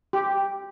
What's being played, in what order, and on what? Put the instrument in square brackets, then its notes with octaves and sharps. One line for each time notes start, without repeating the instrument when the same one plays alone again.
[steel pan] G4